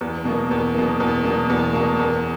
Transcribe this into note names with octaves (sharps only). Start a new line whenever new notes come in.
E2
B2 A#3
E2
B2 A#3
E2
B2 A#3
E2
B2 A#3
E2